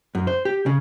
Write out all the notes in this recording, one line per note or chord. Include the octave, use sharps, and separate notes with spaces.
F#2
C5
G4
C#3